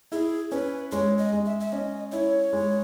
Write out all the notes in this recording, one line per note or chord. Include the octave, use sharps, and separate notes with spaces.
E4 G#4
C#4 B4
G#3 C#5
D#5
G#3
E5
E5
C#4 D#5
E4 C#5
G#3